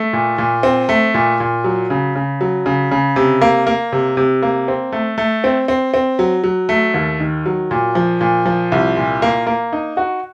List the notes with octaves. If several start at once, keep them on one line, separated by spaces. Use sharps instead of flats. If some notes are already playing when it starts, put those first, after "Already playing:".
Already playing: A3
A#2
A#2
C4
A3
A#2
A#2
F#3
C#3
C#3
F#3
C#3
C#3
C3
A#3
A#3
C3
C3
A#3
C4
A3
A3
C4
C4
C4
F#3
F#3
A3
D#2
D#3
F#3
A#2
F3
A#2
F3
C2
A#2
A#3
A#3
D#4
F#4